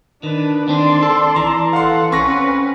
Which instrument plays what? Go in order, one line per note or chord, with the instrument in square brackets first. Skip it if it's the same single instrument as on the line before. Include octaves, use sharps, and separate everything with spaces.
[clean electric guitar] D#3 [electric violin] D4 B4
[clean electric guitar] D#3 C4 D4 [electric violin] D5 C6
[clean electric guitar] A4
[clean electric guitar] E3 [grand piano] A#5
[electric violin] A4 F#5 [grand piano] F5 C6
[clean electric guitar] C4 [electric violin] C#4 B4 [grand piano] C#6 A#6